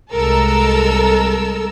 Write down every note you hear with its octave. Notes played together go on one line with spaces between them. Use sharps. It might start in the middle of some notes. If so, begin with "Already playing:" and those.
C2 G#3 A4 A#4 E6